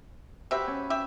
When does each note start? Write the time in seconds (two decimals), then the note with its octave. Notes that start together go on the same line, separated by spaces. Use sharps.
0.51 C4 F#4 G4 B4 E5
0.67 C#4
0.90 G4 E5